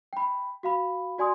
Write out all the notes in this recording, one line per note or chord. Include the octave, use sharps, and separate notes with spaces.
G5 B5
F#4 F5 B5
F#4 D5 G#5 C6 D#6